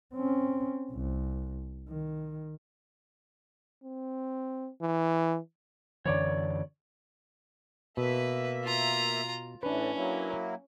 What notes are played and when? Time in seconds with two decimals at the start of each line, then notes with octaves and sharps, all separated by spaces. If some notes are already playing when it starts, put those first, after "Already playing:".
0.14 C4 C#4
0.92 C2
1.89 D#3
3.84 C4
4.82 E3
6.06 F#2 D3 E3 C#5 D5
7.97 B2 A#3 B4 E5
8.64 F4 A#5
9.63 A2 E3 C#4 D4 B4
9.95 F#3 A#3 E4